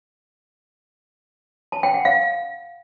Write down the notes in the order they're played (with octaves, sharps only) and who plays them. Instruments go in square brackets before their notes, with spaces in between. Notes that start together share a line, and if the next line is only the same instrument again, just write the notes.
[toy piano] A5
G5
F#5
F5